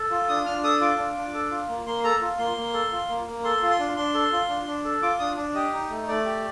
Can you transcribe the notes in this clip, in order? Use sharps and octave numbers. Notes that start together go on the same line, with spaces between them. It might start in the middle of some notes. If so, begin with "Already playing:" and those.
Already playing: A4
F4
D4 D#6
D4 F6
A4 D#6
F4 D6
D4
D4
A4
F4
A#3
A#3 C6
A4 A#5
F4
A#3 C6
A#3
A4
F4
A#3
A#3
A4 C6
F4
C6
D4
D4 C6
A4
F4
D4
D4
A4
F4 D6
D4 D#6
D4
G4 D#5
D#4
A3
A3 D5
G4